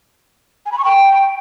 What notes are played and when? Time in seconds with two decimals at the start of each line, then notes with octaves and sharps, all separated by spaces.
0.66 G#5
0.72 B5
0.78 C#6
0.84 G5